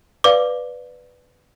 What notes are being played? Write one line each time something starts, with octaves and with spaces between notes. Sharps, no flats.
B4 D5 F5 D6